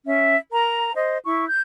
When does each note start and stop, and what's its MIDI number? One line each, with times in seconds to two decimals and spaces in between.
0.07 0.36 61
0.07 0.36 76
0.52 0.92 70
0.52 0.92 82
0.95 1.18 72
0.95 1.18 75
1.25 1.46 64
1.25 1.46 85
1.49 1.59 91